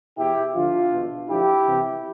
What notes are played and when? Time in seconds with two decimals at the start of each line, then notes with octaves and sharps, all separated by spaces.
0.17 E2 B2 E4 G4
0.54 D2 D3 F3 D4 F4
0.92 E2 B2
1.29 D2 D3 F3 E4 G4
1.66 C2 C3 E3